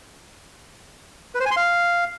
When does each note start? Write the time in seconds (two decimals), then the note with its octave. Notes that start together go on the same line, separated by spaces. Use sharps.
1.35 B4
1.40 C5
1.46 G#5
1.51 C6
1.57 F5